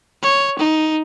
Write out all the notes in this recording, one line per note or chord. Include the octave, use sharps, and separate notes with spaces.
C#5
D#4